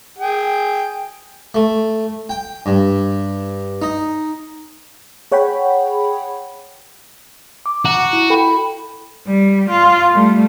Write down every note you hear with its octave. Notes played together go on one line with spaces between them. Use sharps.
G#4 G5
A3
G5
G2
D#4
G#4 C#5 F#5 G5 B5
D6
F#4 A#5
E4
A4 G5 B5
G3
F4
G3 A3